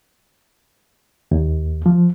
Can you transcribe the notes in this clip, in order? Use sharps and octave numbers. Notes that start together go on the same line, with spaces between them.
D#2
F3